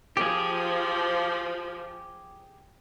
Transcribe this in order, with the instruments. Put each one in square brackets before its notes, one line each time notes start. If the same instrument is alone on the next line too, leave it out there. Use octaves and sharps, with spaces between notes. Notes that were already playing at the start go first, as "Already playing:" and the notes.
[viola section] F3 [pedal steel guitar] G4 G#4